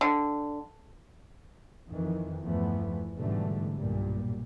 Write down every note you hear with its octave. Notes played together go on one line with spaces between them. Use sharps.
D3
F2 D#3 E3
E2 G2 E3 F3 A3 B3
G#2 B2 D3 E3 G3 A3
B1 G2 A#2 G3